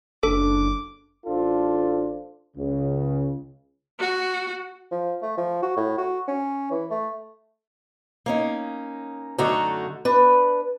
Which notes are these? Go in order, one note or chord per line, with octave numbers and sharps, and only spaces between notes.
F#1 D4 A4 D6
A1 D4 F4 A4 C5
C#2 C#3
F#4
F3
A3
F3
F#4
A2
F#4
C#4
E3
A3
A#3 C#4 D#4
F#2 D3 A3 D#4 F#4 A#5
D4 B4